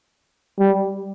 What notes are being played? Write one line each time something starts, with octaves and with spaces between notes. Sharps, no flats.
G3